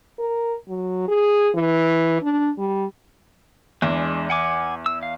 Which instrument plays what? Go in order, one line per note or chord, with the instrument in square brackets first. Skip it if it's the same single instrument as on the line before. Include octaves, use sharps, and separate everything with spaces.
[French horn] A#4
F#3
G#4
E3
D4
G3
[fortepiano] E2 [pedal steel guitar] G#3 D4
[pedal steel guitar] F#5 G#5 D6
E6
F5